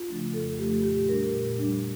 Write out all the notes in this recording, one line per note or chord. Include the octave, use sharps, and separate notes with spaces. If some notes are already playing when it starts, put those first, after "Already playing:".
Already playing: F4
C#3 F3 A3 D4
F2 A4
C#3 F3 A3 D4 G4
A#2 G4
G3 D4 A#4
A#2
G3 D4